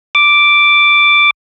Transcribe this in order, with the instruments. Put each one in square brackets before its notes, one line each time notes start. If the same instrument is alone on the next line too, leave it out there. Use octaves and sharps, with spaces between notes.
[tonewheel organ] D6